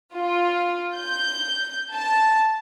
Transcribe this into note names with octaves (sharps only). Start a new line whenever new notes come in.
F4
G6
A5